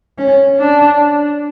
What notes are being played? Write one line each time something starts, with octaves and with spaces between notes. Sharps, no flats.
C#4
D4